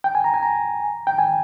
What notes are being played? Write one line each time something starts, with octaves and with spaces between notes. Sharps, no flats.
G5
G#5
A#5
G#5
A#5
G5
G#5